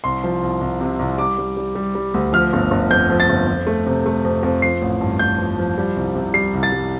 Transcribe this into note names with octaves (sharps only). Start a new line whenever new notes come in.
C2 C6
F3
C2
C2
C3
C2
G3 D6
G3
G3
G3
G3
D2
F3 F6
G1
G1
F2 G6
F3
A6
G1
F2
A3
C3
A3
F2
F2
F3 C7
A1
G2
A1 G6
F3
F3
G3
C2
C3
G3 C7
C2
A6
G3